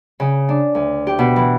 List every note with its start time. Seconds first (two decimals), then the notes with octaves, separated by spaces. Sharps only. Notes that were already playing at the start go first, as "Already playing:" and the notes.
0.20 C#3
0.49 D4
0.75 D2
1.07 G4
1.19 B2
1.36 E3